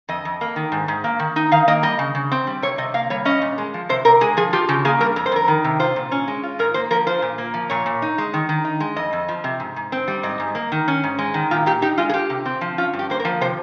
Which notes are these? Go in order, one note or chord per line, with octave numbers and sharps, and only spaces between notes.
F2 D#5
F2
A#3
D#3
G#2
G#2
A#3
D#3
D#4
D#3 F5
A#3 D#5
G3 D#5
C#3
C#3
C4
G3
C3 C#5
C3 D#5
A#3 F5
G3 C#5
C#4 D#5
A#2
G#3
F3
C3 C5
C3 A#4
G#3 G#4
F3 G#4
F4 G4
C#3 G4
A#3 G#4
G3 A#4
F2 A#4
C5
F2 A#4
D#3
C3
F4 C5
A#2
C#4
G#3
F4
G#2 A#4
A#3 C5
F3 A#4
F4 C5
A#2
A#3
F3
A#2 C#5
A#2
D#4
G#3
D#3
D#3
D#4
G#3
F2 D#5
F2
F3
C3
G#2
G#2
C4
G3
G#2 D#5
G#2
A#3
D#3
C#4
G#2
G#3
D#3
A#2 F4
A#2 G4
D#4 G4
G#3 F4
G#4
F4 G4
C3
C4
F3
C#4 F4
G2
G4
A#3 C5
A#4
F3
C3 C5